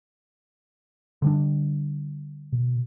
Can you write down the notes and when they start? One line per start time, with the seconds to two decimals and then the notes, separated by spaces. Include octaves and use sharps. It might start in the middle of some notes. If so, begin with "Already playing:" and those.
1.22 D3 G3 D4
2.52 B2